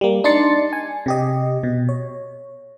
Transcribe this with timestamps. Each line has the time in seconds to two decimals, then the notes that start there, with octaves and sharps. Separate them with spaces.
0.01 G3 A#3
0.24 D4 D#4 D5 C6 A6 C#7
0.73 G#5
1.06 C3 G4 D#5
1.63 B2
1.89 C#5